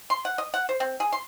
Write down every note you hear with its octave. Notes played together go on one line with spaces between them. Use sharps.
C6
F#5
D#5
F#5
C5
C4
G#4
C6